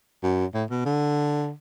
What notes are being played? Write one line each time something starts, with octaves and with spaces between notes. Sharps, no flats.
F#2
A2
B2
D3